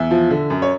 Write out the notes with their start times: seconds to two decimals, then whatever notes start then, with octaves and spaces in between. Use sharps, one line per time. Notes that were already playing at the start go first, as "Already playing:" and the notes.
Already playing: E2 E5
0.11 F3
0.30 D3
0.50 F#2
0.62 C#5